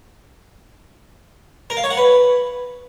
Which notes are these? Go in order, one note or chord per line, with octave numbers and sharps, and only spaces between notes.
A#4
F5
C#5
F#5
B4